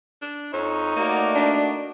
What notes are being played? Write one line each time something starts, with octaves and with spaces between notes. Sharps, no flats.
D4
F2 D#4 C#5
A3 A#3 F#4 D5
D4